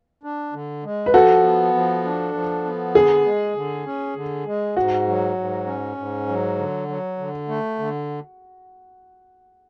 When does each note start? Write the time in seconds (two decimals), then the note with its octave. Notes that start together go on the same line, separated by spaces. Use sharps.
0.23 D4
0.53 D3
0.84 G#3
1.06 B4
1.13 F3 F#4 A4
1.44 B3
1.74 F3
2.05 D4
2.34 F3
2.64 B3
2.95 D3 G#4
3.25 G#3
3.56 D3
3.86 C#4
4.16 D3
4.46 G#3
4.76 G#2 F#4
5.07 F#3
5.37 G#2
5.67 C#4
5.97 G#2
6.28 F#3
6.57 D3
6.88 F#3
7.18 D3
7.48 A3
7.79 D3